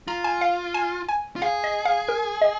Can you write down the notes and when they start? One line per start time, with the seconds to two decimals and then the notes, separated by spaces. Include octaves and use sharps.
0.08 F4 A#5
0.24 G#5
0.41 F5
0.74 G#5
1.09 G#5
1.36 F4
1.42 G#4 F5
1.64 D#5
1.85 F5
2.09 A#4
2.41 D#5